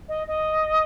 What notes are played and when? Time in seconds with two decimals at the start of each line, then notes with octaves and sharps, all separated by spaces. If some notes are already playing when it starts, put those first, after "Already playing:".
0.08 D#5
0.27 D#5